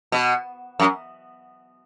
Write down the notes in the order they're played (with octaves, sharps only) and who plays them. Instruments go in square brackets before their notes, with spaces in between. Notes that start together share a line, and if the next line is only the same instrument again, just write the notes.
[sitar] B2
F#2